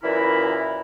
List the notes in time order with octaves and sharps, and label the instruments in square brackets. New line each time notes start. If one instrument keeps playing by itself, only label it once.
[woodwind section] F#2 A#2 E3 E4 A#4 B5